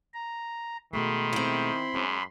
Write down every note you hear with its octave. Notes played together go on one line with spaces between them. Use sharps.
A#5
B2 D#3 G#3 A3 B5 C6
C4 E4
F#2 G#3 C#4